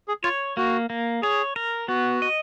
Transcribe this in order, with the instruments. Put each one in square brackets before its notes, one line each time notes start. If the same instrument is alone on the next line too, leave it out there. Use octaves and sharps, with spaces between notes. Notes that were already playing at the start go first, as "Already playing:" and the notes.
[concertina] G#4
[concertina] F4 [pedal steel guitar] C#5
[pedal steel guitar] A#3 [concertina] F#4
[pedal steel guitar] A#3
[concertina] G#4 [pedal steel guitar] C#5
[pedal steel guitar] A#4
[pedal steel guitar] B3 [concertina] F#4
[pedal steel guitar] D#5